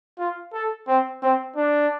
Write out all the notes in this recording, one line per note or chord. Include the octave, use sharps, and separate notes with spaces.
F4
A4
C4
C4
D4